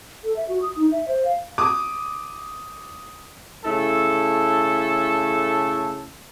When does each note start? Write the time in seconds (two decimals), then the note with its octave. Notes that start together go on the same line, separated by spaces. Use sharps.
0.24 A4
0.36 E5
0.49 F#4
0.62 D#6
0.76 D#4
0.92 E5
1.08 C5
1.25 F5
1.58 D6 D#6
3.64 C#3 A3 E4 A4